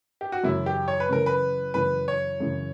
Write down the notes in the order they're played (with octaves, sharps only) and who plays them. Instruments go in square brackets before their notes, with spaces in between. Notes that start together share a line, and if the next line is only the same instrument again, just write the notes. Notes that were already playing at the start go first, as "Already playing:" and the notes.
[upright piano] G4
F#4
[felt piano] F#2 C#3 E3 [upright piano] E4
[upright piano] G4
C#5
B4
[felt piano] F#2 C#3 E3 [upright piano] A#4
[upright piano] B4
[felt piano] F#2 C#3 E3 [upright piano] B4
[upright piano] C#5
[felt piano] F#2 C#3 E3